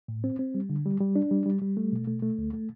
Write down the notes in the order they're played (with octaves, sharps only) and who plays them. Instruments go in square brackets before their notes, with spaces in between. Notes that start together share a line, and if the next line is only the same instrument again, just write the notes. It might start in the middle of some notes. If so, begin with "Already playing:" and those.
[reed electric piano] A2
C4
C4
G3
D3
G3
G3
D4
G3
G3
G3
A3
B2
A3
A3
D2
A3